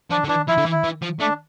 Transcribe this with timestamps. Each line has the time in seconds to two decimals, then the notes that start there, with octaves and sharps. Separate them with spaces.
0.11 F3 D4
0.24 D3
0.29 E3 D4
0.48 F3 E4
0.57 D3
0.66 E3
0.72 E4
0.84 E3
1.02 F3
1.20 A3 D4